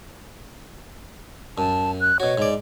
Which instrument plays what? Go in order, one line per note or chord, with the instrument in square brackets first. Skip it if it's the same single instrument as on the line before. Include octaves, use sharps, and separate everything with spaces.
[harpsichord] F#2 [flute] A5
[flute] F#6
[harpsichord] B2 F#4 [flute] C#5
[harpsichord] G#2 D5